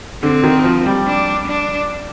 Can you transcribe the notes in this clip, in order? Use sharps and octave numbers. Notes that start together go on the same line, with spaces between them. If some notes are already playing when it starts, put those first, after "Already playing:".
D3 C4
D#3
F3
G3
D4
D4